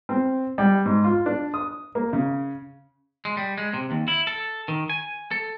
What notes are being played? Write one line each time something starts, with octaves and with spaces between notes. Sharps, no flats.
C4
G3
G#2
F4
D4
D#6
A#3
C#3
G#3
G3
G#3
C3
D#2
E4
A4
D#3
G#5
A4